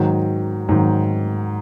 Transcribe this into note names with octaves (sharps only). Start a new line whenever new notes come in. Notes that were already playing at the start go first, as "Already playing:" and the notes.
Already playing: G#2 D#3 F#3
G#2 D#3 F#3